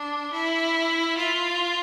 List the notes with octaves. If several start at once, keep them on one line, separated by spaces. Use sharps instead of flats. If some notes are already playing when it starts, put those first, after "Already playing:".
Already playing: D4
E4
F4